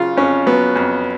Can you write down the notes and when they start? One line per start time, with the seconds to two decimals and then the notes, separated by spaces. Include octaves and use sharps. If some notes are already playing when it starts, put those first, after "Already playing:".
Already playing: C#3 F#3 F4
0.17 F2 C#4
0.47 F#3 B3
0.76 F2